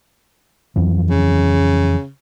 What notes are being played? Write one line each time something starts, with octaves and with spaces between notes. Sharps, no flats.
F2 E3 F#3
C#3